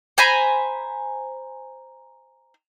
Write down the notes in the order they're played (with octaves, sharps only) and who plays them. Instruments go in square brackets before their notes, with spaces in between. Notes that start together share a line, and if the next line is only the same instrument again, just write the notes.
[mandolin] C5 G#5 A#5 B5